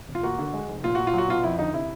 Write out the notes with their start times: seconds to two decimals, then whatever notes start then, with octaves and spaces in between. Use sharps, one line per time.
0.09 E1
0.15 F4
0.23 A#3 F#4
0.39 D3
0.54 G#3
0.68 F1
0.84 A#2 F4
0.95 A#2 F#4
1.07 F4
1.14 F#3 F#4
1.28 B2 F4
1.43 F2 E4
1.59 D3 D#4
1.74 C3 E4